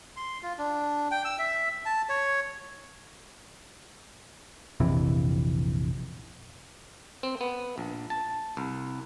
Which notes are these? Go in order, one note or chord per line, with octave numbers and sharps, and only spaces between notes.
C6
F4
D4
G5
E6
E5
A5
C#5
A#1 F2 C3 E3
C4
B3
A#1
A5
C2